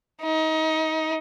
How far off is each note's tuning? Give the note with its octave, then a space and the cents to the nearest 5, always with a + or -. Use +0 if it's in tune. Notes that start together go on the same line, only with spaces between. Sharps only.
D#4 +25